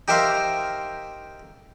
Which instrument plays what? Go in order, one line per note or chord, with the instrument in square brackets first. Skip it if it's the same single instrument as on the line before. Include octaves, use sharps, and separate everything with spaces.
[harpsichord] D#4 G4 A#4 C5 E5 F5